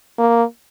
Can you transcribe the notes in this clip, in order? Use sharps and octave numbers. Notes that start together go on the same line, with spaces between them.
A#3